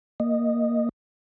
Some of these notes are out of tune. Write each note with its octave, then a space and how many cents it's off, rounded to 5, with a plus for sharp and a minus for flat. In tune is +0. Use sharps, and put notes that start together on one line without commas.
A#3 +0 D#5 -10